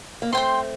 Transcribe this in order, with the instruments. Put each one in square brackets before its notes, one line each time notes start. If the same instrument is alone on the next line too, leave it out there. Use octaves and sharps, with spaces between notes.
[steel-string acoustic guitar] A#3
[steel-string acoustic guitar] A3 C4 [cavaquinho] C5 G5 C6